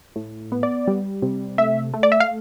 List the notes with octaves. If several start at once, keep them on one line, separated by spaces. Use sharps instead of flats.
A2
B3
D5
G3
C3
A3 E5
A3
D5
E5
F5